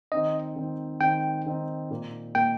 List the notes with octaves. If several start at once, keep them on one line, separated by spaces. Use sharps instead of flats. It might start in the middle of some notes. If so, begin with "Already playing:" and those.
D#3 C4 D#4 D#5
D#3 C4 D#4
D#3 C4 D#4 G5
D#3 C4 D#4
A#2 A#3 D#4
A#2 A#3 D#4 G5